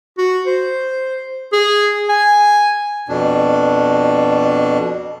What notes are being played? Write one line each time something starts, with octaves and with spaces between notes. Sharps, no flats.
F#4
C5
G#4
G#5
F2 B2 D4